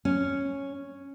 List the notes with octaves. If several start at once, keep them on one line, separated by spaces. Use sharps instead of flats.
C#4